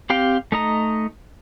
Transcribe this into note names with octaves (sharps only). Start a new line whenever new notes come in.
C4 G4 F5 G5
A3 D#4 D#5 A#5